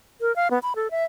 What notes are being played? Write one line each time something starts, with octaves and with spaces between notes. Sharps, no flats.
A#4
F5
B3
B5
A4
E5